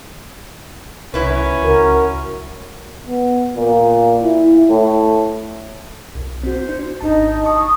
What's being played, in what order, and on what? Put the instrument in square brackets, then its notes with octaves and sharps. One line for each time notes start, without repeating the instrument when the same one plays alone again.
[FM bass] C2 [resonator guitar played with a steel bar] F#2 E4 B4 [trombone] C#4
[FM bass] C#2 [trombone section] F#4 A#4
[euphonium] B3
A#2
E4
A2
[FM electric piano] B1
[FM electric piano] C4 F#4 [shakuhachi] C5
[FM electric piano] D4
[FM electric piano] G#1 A5 [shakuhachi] D#4
[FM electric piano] A5 C#6 [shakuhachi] D#6